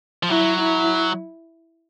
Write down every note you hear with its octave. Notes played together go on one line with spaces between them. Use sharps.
F3
F#3 E4
E4